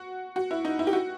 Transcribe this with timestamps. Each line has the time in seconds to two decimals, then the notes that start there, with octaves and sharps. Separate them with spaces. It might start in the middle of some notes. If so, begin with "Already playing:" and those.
Already playing: F#4
0.36 F#4
0.51 E4
0.65 D#4
0.79 E4
0.87 G4
0.93 F#4